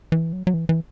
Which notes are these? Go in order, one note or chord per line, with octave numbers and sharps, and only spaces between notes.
E3
F#3
F#3
E3
E3